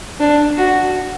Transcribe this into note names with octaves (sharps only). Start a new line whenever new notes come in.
D4
F#4